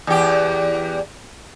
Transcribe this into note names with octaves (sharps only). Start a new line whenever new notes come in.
E2 G4